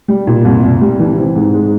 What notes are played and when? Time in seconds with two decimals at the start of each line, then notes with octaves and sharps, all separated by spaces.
0.08 G3
0.27 A#2
0.45 C2
0.64 C2
0.81 G3
1.00 E3
1.18 C4
1.35 G#2
1.54 G#3